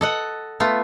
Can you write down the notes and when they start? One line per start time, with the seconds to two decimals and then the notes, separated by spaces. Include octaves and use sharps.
0.01 A4 D#5 F#5
0.60 A3 B3 F4